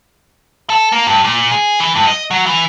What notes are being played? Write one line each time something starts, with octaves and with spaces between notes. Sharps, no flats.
A4
A#3
G2
A#2
G#4
E3
G2
D#5
F#3
E3